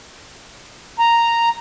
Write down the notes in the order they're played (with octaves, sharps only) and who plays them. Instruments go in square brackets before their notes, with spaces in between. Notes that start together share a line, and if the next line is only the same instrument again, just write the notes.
[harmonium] A#5